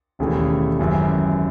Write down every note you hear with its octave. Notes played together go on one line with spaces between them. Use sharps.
E1 D#2 C#3 E3 A3
G#1 F#2 E3